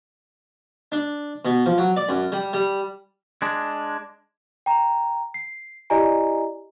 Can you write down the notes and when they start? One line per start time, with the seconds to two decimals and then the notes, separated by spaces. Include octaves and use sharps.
0.92 D4
1.45 B2
1.66 F3
1.78 F#3
1.97 D5
2.09 F#2
2.32 G3
2.53 G3
3.42 G#3 D4
4.66 G5 A#5
5.34 C7
5.90 E4 G4 D5 D#5 G#5 A#5